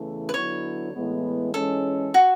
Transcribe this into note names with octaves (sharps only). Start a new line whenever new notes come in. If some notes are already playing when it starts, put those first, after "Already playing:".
Already playing: E2 C#3 E3 A3
B4
D3 F#3 B3 E4 C#5
A2 E3 G#3 B3
G#2 E3 G#3 C#4 A4
F#4